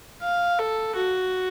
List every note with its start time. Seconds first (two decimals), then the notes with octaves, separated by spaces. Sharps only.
0.22 F5
0.59 A4
0.96 F#4